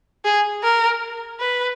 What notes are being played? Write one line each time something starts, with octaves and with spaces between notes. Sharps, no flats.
G#4
A#4
B4